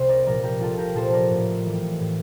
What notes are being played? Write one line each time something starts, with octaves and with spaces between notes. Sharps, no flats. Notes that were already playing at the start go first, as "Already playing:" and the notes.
Already playing: C2 C5
A#4 D5
A#2 F3 A#4 D5
G4 A#4
C2 F4 A4
G4 A#4
A#2 F3 A4 C5
A#4 D5
A2
E3 G3
A2